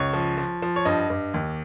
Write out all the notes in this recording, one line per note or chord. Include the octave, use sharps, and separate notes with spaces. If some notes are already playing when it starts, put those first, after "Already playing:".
Already playing: C#2 C#5
F3
F3
F3
C#5
G2 D#5
G2
D#2